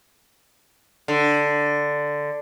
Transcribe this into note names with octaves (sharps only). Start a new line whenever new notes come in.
D3